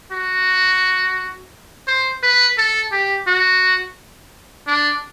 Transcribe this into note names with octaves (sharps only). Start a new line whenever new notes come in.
F#4
C5
B4
A4
G4
F#4
D4